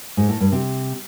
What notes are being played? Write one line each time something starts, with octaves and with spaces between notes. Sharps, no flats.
G#2
A2
G2
C3